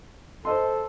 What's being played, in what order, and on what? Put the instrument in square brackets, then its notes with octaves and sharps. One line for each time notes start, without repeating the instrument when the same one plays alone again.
[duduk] A4 [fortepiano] C5 D#5 C6